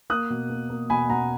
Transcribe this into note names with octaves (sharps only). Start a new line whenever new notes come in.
A#3 D#6 F#6
B2
A#3
A#3
B2 G#5 B5
B2 F#5 A#5